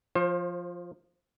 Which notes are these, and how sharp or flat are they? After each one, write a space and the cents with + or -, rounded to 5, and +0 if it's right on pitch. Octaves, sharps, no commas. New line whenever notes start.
F3 +0 C5 +35